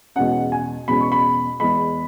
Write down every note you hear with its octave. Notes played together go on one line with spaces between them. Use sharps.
E2 B2 G#3 C#4 F#5
G#5
E2 B2 G#3 C#4 B5
C#6
B5
E2 E3 G#3 B5